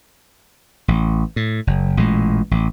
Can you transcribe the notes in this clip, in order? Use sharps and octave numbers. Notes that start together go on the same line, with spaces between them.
A1
A2
F#1
A1 A#2 G#3
A1